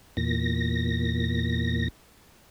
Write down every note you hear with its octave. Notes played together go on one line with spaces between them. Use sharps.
E2 A#2 A#6